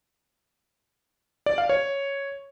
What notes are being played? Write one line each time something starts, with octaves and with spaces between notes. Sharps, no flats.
D5
F5
C#5